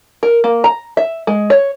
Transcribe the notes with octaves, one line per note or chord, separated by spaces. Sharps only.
A#4
A#3
A#5
E5
G#3
C#5